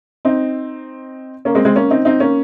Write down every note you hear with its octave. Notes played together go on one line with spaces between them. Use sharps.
C4 D#4
A#3 C#4
G#3 C4
G#3 C4
A#3 C#4
C4 D#4
C4 D#4
A#3 C#4